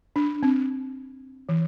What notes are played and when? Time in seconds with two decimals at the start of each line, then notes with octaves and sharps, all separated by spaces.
0.16 D4
0.43 C4
1.49 E3